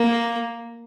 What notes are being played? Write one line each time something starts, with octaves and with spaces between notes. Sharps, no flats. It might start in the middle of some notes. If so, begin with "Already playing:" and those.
Already playing: A#3